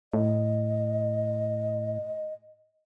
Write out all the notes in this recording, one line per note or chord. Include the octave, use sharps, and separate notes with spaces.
A2 D#5